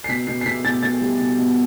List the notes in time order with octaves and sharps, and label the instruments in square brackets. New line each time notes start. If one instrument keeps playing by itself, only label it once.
[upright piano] C7
B2 B6
B2 C7
C7
B2 B6
B2 A6
B2 A6
G3
B2
B2